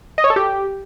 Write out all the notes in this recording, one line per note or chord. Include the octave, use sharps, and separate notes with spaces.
D#5
C#5
A4
G4